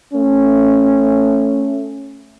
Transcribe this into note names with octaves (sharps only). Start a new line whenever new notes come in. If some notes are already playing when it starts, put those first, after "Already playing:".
A3 C#4